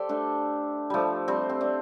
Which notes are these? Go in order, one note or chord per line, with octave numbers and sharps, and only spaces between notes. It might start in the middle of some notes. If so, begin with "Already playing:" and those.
Already playing: G4 A4 C5 D5
A3 D4
F3 G3 A3
G3 C4
C4
A3 D4